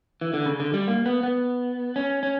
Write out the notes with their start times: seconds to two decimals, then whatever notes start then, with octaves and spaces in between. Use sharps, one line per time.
0.21 E3
0.34 D3
0.46 C#3
0.60 D3
0.74 G3
0.88 A#3
1.06 B3
1.23 B3
1.96 C#4
2.23 C#4